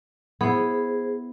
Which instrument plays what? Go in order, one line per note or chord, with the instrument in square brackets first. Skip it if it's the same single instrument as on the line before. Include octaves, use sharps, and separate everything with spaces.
[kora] B3 E4 [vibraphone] G#4 C5